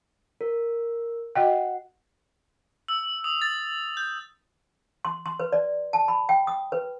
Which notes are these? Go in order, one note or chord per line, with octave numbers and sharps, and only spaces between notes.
A#4
F#4 D#5 F#5 G5
E6
D#6
A6
G6
C6
C6
B4
D5
A5
B5
G5
D#6
B4